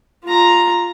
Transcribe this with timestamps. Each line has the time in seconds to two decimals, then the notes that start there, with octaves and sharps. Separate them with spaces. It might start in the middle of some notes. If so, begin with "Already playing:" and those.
0.25 F4 A#5